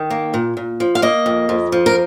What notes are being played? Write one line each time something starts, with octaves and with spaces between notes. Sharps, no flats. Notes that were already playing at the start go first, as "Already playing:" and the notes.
Already playing: D#3
A#3
A#2
A#2
F3
F5
A#3 D#5
F2
F2
F3
A#4